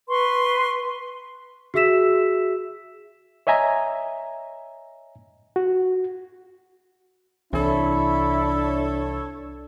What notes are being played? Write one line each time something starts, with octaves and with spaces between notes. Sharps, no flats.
B4 C6 C#6
F#4 G#4 E5 E6 B6 E7
C#5 D#5 E5 G#5 A#5
F#4
C2 E3 D4 E4 A4 C#5